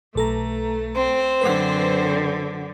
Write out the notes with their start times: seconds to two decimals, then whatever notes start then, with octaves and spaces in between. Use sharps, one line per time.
0.15 B1 A3 A4 A#5
0.95 C4 C5
1.41 F#2 D3 B4 F#5